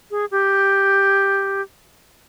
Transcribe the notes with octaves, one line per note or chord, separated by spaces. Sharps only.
G#4
G4